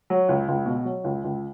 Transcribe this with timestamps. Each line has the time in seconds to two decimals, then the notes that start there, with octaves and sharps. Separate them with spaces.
0.10 F#3
0.29 C#2
0.48 C#2
0.66 B2
0.85 F#3
1.04 C#2
1.24 C#2